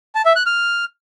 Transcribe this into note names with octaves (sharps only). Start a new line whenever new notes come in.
A5
E5
F#6
F6